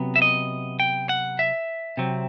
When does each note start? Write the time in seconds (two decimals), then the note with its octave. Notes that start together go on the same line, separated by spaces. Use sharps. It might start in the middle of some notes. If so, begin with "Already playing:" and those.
Already playing: C3 F#3 B3
0.16 E5
0.22 D#5
0.80 G5
1.09 F#5
1.39 E5
1.97 C3 F#3 C4